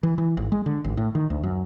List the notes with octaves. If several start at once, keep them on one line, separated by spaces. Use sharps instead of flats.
E3
E3
G#1
G#3
D3
G#1
A2
D#3
D2
F#2